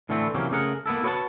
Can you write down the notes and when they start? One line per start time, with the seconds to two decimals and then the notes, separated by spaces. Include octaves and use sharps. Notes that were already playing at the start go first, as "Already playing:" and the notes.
0.09 A2 D3 E3 A3 C4
0.34 C3 E3 F#3 A#3 C#4 G4
0.51 C#3 A3 G#4 A#4 F#5
0.86 A#3 B3 E4 A4
1.04 F#4 B4 C#5 D#5 F#5 A5